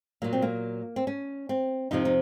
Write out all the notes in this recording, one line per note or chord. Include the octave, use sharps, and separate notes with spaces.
A#2 F#3 A#3
C4
A#3
C4
C#4
C4
F2 C3 F3 D#4
D#4